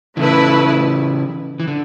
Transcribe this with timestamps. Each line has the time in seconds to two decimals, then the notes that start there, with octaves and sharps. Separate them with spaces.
0.17 C#3 E3 A3 E4 B4
1.60 E3
1.68 D3